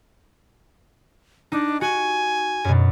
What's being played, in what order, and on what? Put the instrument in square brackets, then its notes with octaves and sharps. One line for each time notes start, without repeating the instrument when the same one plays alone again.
[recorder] D4 [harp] D#4
[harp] F#4 [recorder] G#5
[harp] F#2 B2